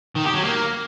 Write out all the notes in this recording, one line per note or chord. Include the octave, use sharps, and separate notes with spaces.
D#3
G4
F#3
A#3